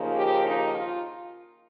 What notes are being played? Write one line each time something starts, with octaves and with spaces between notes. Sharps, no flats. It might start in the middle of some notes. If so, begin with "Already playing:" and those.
Already playing: D#2 C#3 F3 A#3 D#4
G4
D#4
F4